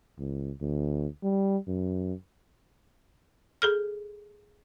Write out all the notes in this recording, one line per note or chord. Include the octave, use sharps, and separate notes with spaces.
C#2
D2
G3
F#2
G#4 A4 F6